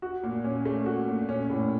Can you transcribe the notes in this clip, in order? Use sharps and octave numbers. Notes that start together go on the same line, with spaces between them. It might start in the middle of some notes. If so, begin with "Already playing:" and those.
F#4
A#2
C#4
A3
F#4
A#2
C#4
A2